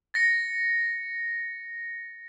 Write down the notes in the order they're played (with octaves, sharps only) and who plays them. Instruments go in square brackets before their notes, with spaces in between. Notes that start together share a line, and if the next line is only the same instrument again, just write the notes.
[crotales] A6 A#6 C#7